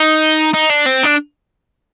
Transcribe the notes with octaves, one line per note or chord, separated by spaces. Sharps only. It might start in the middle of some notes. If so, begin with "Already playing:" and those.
Already playing: D#4
D#4
D4
C4
D4